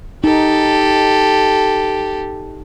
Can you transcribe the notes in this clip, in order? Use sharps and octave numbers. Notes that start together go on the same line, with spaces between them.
D#4 G4 A4